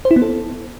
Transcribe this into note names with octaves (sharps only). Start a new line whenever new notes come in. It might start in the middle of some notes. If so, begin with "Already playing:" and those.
C5
E4
B3
A4